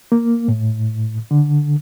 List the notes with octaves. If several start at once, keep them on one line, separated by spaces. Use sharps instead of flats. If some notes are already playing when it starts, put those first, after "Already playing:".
A#3
A2
D3